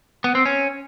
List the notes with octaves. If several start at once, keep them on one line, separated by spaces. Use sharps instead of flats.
B3
C4
C#4